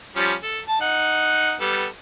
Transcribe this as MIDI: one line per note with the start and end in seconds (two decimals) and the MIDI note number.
0.16 0.34 53
0.16 0.34 55
0.16 0.34 61
0.43 0.60 69
0.68 0.81 81
0.81 1.54 63
0.81 1.54 78
1.61 1.86 55
1.61 1.86 59
1.61 1.86 69